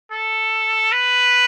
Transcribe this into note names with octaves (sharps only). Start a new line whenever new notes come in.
A4
B4